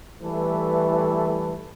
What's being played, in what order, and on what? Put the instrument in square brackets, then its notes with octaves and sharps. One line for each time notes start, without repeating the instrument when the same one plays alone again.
[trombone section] E3 G3 A3 A4 B4